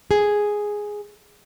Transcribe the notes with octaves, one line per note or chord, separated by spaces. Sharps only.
G#4